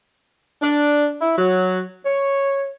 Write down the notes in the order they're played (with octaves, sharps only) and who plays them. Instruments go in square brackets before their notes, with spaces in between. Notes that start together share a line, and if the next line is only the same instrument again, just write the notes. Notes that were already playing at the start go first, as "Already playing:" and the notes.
[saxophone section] D4
E4
F#3
C#5